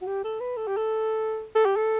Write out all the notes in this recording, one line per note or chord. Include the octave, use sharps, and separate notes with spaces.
F#4
G4
A4
B4
A4
G4
A4
A4
G4
A4